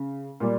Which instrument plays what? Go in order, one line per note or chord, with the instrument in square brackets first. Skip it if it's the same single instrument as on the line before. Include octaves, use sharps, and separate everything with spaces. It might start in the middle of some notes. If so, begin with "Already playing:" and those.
Already playing: [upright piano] C#3
A#2 G3